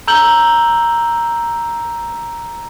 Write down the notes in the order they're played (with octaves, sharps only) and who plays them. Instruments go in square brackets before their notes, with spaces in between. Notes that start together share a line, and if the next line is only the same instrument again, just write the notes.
[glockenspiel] A#5 E6 G6 F#7 G7